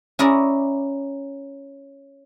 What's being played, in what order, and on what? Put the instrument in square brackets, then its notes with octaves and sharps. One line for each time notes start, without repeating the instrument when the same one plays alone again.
[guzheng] C#4 E4 G#4 A#4 D5